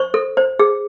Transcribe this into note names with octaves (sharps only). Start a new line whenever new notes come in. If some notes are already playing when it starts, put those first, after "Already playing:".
Already playing: C5 C#6
A4
C5
G#4